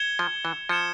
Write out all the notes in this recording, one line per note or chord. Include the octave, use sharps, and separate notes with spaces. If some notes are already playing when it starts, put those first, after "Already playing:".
Already playing: G#6 C#7 E7 G7
F3
E3
F3 G#6 C#7 E7 G7